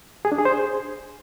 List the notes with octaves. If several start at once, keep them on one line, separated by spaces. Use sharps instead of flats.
G#4
D4
G#4
C5
G#4